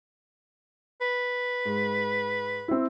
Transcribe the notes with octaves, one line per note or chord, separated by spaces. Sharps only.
B4
G#2
C4 E4